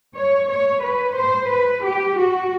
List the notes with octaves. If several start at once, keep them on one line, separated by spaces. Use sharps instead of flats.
C#5
C#5
B4
C5
B4
G4
F#4